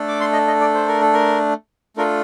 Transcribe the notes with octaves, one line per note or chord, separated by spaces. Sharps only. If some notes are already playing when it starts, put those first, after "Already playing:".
Already playing: A3 D4 A4
D6
C6
D#5
D#5
D5
C5
A#4
A4
A#4
A3 D4 F4 A4 A#4